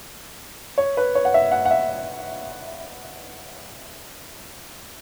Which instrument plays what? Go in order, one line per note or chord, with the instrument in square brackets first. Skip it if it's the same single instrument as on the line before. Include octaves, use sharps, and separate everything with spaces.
[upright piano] C#5
B4
C#5
F#5
E5
F#5
F#5
E5